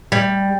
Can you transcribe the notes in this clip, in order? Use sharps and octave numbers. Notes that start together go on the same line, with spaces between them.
G3